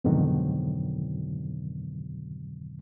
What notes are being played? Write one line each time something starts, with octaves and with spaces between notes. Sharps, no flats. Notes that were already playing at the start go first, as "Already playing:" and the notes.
F2 G#2 B2 D3 D#3 F#3